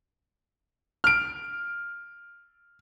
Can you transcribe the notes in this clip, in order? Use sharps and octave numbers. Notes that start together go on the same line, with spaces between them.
F6 D7